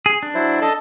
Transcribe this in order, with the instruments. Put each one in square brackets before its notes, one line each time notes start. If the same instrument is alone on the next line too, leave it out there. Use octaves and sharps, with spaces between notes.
[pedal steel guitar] G#4
D4
[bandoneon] F#3 E4 C5
A4 D#5 A5